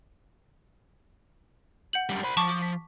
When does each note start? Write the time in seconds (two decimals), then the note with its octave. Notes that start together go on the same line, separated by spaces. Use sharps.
1.93 F#5 G6 F#7
2.09 F#2 G3
2.24 C5 B5
2.37 F3 A5 C#6 D6
2.49 D6
2.62 B6